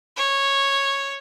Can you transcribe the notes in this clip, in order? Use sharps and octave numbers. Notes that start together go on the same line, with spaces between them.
C#5